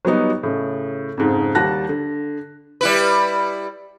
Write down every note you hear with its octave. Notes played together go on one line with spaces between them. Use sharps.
F#3 G3 B3 D#4
A2 C#3
F2 G#2 C#3
D#2 G3 F#5 A5 F#6 A#6
D3
G3 E4 B4